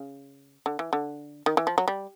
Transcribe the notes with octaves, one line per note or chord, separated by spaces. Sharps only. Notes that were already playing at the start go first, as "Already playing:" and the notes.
Already playing: C#3
D3
E3
D3
D#3
E3
F3
F#3
G3